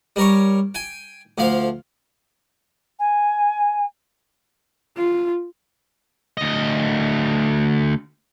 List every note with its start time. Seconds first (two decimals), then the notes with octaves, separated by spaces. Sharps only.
0.16 G3 A#4 C#5
0.75 G5 G#5
1.38 D2 F3 F5
2.99 G#5
4.97 F4
6.37 D2 D#5